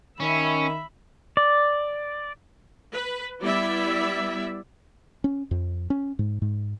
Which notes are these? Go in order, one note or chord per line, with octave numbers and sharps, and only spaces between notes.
D#3 C#4 E5 B5
D5
B4
G3 B3 E4 D5 E5
C#4
F2
C#4
G#2
G#2